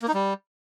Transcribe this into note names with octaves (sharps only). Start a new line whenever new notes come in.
A#3
D#4
G3